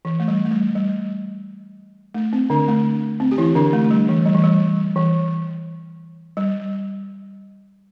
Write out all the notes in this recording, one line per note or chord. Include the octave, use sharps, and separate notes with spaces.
E3
A3
G3
A3
G3
G3
A3
C4
D3 D4
A3
C4
G4
E3 E4
D3 D4
A3
A3
G3
E3
G3
E3
G3
E3
G3